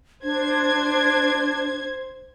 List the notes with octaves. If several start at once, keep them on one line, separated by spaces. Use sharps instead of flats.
D4 C5 G#6